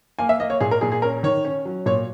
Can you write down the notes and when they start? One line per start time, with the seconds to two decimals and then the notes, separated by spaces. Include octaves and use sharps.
0.19 A#3 G#5
0.29 E5
0.40 A#3 D#5
0.50 C#5
0.60 A#2 G#4
0.71 A#4
0.81 A#2 G#4
0.92 G#4
1.02 C#4 A#4
1.23 D#3 C#5
1.45 C#4
1.65 F#3
1.86 A#2 C#5